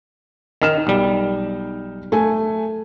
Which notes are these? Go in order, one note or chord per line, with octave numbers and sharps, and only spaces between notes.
D#3 D#4 F6 E7
B1 G3
A3 G#5